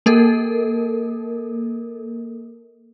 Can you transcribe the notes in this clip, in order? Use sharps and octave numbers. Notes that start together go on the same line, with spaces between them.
A#3 A4 A#4